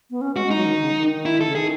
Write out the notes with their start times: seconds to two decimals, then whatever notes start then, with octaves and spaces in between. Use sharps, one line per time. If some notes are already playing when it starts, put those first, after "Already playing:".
0.11 B3
0.21 C#4
0.36 G#3 F#4
0.46 G#3
0.50 D#4
0.57 F#3
0.66 D#3
0.81 C#3
0.96 D#3
1.26 E4
1.41 C#3 A4
1.55 D#3 G#4